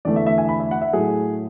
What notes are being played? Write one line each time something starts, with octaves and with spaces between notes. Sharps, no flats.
E2 D3 A3 D5
E5
E5
G#5
B5
E5
F#5
E5
A2 F#3 A3 G#4